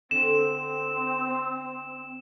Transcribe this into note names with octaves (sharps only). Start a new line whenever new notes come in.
D3 C4 E7